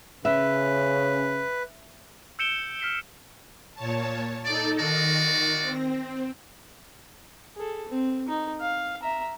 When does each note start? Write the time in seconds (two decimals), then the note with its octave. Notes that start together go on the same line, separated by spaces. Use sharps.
0.25 C#3 C#4 B4 E5
2.39 E6 G6 C#7 D7 E7 G7
2.80 F6 B6 C7 G7
3.75 A#2 C#5 A5
4.45 D#4 A4 D5
4.79 D#3 F4 F#4 D5 A#6
5.62 C4
7.56 G#4 A4
7.88 C4
8.29 D#4
8.61 F5
9.03 E5 A#5